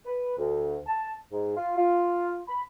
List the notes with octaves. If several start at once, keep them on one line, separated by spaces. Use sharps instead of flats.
B4
D2
A5
G#2
F4
F4
B5